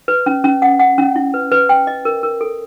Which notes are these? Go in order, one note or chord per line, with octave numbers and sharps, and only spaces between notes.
B4
C#4
C#4
F#5
F#5
C#4
E4
B4
B4
G5
D#5
A#4
A#4
A4